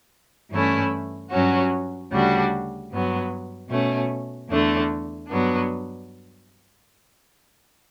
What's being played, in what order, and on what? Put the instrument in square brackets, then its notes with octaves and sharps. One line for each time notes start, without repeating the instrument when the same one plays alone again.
[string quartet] G2 E3 A3 C#4 E4
G2 F#3 C#4 F#4
D2 C#3 G3 D4 F#4
G2 F#3 B3
B2 A3 C#4
E2 D3 A3 D4
G2 F#3 B3 D4